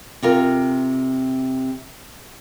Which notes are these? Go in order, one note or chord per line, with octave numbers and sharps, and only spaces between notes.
C3 F4 A#4